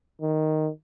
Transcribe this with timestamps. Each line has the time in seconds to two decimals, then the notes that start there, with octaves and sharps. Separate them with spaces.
0.21 D#3